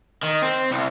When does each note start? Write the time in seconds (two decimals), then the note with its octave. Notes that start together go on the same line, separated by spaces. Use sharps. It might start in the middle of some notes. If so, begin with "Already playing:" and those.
0.23 D#3
0.42 C4
0.71 C2